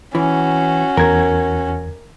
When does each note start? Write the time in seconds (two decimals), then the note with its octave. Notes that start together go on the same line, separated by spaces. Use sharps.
0.15 E3 C#4 F#4
0.97 E2 A#4 G#6